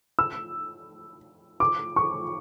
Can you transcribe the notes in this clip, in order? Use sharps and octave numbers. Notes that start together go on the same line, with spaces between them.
E6
D6
C#6